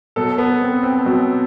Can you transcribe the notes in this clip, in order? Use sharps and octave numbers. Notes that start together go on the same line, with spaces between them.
B2 F#3 A4
B3
C4
C4
B2 F#3